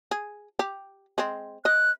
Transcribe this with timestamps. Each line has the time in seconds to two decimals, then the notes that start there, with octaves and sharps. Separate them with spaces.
0.11 G#4
0.59 G4
1.18 G#3 C4
1.65 D#5 F#6